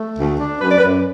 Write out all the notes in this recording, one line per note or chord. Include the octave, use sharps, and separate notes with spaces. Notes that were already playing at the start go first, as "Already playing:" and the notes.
Already playing: A3
D2
D4
F#2 B4
D5
B4
F#2